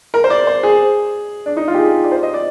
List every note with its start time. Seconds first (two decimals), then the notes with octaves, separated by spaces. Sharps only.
0.14 A#4
0.24 C5
0.30 D5
0.47 C5
0.63 G#4
1.46 D4
1.57 D#4
1.68 F4
1.75 G4
1.78 G#4
2.04 D5
2.12 C5
2.23 D#5
2.34 D5